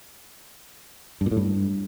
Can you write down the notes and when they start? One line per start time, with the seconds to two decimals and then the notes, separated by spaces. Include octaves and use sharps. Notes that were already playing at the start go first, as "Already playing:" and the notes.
1.21 G2
1.26 A#2
1.31 A2
1.37 G2